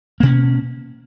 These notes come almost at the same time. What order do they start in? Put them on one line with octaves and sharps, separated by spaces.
A#3 B2 C#4